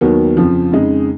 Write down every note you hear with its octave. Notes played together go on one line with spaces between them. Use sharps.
D#2 D#3 F#3 B3
F2 C#3 F3
F2 C#3 G#3 D#4